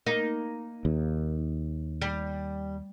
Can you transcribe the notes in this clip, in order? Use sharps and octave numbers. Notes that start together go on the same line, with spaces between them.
A#3 D#4
D#2
G3